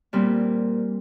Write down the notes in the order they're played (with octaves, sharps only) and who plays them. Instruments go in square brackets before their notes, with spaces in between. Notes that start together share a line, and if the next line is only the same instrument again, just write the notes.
[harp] A#2 G3 C4